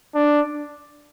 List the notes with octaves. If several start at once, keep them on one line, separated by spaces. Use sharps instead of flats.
D4